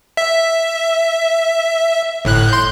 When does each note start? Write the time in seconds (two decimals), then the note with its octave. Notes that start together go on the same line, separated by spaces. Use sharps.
0.17 E5
2.25 G1 A2 F#6
2.49 C6 G6